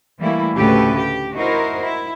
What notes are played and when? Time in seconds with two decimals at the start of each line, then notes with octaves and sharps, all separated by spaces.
0.18 E3 G3 A3 A#3 E4
0.54 D2 A2 C#3 G4 A4 B4
0.96 G4
1.35 D#4 E4 F#4 A#4 C5
1.81 E4